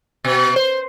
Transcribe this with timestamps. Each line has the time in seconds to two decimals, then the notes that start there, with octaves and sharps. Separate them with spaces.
0.25 B2
0.56 C5